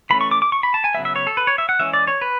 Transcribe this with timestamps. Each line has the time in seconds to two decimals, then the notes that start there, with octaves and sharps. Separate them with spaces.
0.10 E3 A3 C#4 B5
0.21 C#6
0.31 D6
0.42 D6
0.52 C#6
0.63 B5
0.74 A5
0.84 G#5
0.95 C#3 F#3 B3 E5
1.05 E5
1.16 C#5
1.27 A4
1.37 B4
1.47 C#5
1.58 E5
1.69 F#5
1.79 E3 G#3 C#4 E5
1.93 D5
2.07 C#5
2.22 B4